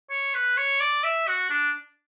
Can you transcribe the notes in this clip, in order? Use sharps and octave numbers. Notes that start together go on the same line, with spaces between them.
C#5
B4
C#5
D5
E5
F#4
D4